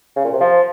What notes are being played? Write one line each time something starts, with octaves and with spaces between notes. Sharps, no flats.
C#3
A#2
C3
F3